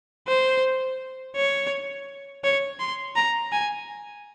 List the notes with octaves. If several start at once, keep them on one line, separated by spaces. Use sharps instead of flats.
C5
C#5
C#5
C6
A#5
G#5